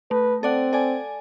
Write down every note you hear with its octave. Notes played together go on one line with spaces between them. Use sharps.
A3 B4
C4 A4 D5 F#5
A4 D5 G#5